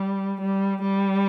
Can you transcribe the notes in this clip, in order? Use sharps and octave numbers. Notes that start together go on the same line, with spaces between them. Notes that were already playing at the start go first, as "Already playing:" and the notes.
Already playing: G3
G3
G3